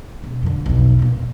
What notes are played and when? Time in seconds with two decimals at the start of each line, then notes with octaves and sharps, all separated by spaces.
0.24 E1
0.43 F2 D3
0.66 B1 E2
0.99 F2 A#2